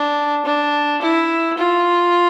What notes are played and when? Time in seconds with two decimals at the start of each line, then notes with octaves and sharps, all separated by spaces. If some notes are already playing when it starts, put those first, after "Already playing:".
Already playing: D4
0.45 D4
1.02 E4
1.57 F4